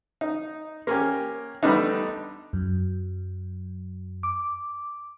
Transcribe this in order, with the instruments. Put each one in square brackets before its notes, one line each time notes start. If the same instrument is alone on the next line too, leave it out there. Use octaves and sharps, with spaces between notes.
[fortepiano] D#4
A#3 C#4 G4
D3 G3 A3 B3 D4 D#4
[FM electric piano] F#2
D6